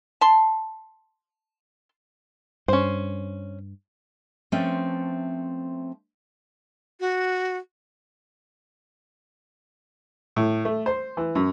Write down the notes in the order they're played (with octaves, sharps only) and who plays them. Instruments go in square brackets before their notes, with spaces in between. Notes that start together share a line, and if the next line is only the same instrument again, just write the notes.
[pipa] A5 C6
[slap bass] G2 [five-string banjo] C#4 C5
[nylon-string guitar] F3 A3 C4 C#4 B4 E5
[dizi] F#4
[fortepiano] A2
A3
C5
E3
F#2